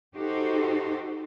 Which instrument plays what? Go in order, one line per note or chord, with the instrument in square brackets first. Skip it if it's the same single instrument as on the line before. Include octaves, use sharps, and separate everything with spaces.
[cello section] D#4 F#4 G4 A4 C5